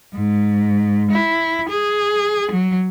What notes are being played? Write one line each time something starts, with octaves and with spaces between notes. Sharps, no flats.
G#2
E4
G#4
F#3